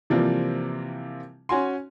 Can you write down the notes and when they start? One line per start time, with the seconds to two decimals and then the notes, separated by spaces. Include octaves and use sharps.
0.10 C3 E3 F3 G3 A#3 C4
1.49 C#4 F#4 G#5 C6